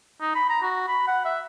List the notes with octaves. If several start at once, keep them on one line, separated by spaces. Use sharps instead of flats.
D#4
B5
A#5
F#4
B5
F#5
E5